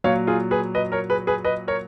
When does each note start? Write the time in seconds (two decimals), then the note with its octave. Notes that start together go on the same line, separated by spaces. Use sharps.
0.04 A#2 F#3 C#5 F5
0.27 F4 G#4
0.51 G#4 B4
0.75 B4 D#5
0.92 A#4 C#5
1.10 G#4 B4
1.27 G#4 B4
1.45 B4 D#5
1.68 A#4 C#5